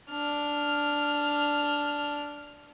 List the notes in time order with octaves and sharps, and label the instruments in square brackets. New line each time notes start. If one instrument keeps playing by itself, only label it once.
[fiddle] D4 F6